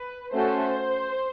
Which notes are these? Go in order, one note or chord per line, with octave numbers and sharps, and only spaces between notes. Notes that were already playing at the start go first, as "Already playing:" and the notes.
Already playing: B4
A3 C#4 F#4 A4 C5